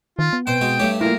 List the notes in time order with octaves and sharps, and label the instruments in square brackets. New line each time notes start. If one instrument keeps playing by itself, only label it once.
[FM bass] D#3 [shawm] F4
[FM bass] B3
[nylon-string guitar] B2 C4 [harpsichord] C5 [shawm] G5
[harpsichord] G#3 F#4
[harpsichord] G2 A3 G4 [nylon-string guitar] C#5
[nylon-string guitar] F3 A#3 [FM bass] E4 [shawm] A#4